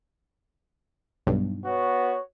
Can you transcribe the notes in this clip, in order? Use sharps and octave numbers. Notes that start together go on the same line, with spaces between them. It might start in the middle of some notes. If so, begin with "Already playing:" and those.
B1 G2
B3 F#4 C#5